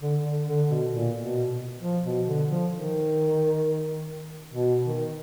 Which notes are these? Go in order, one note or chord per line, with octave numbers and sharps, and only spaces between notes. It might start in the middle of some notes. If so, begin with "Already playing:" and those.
D3
D3
D3
B2
A#2
B2
F3
B2
D3
F3
D#3
B2
D#3